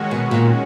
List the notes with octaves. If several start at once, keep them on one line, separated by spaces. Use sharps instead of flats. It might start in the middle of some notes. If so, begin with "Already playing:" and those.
Already playing: D#3 G#3 C#4 F#4
B2
A#2